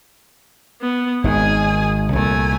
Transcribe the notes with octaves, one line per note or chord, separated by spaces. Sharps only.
B3
G#1 D#3 G#4 G#5
C2 A#2 A3 G#5